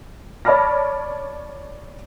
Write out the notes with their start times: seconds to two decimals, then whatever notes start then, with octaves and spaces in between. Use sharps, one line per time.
0.45 C#5 D5 A5 B5 F6 A#6